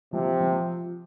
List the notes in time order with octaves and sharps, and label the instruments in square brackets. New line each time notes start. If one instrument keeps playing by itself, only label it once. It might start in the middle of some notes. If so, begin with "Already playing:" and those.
[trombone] C3 [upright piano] F3
[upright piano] F3